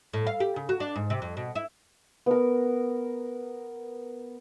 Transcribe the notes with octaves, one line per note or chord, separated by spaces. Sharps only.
A2
F5
G4
C#3
F#4
D4
G#2
C3
F2
B2
E4
B3 A#4